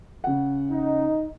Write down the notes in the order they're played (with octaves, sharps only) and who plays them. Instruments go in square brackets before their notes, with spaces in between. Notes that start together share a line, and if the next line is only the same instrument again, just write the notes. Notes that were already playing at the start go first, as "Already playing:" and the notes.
[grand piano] C#3 F#5
[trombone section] D#4